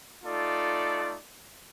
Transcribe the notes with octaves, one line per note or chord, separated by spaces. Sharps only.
A3 D#4 F4 A4 D5